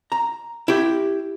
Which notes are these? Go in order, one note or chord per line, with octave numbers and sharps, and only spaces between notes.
A#5
E4 G4